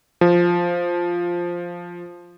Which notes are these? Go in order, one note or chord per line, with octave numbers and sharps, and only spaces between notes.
F3